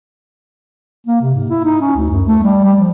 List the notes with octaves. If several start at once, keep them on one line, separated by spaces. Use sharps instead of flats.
A#3
C3
G#2
E4
D#4
C#4
D2
F#2
A3
G3
G3
F3